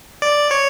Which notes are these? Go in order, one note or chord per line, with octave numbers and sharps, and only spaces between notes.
D5
C#5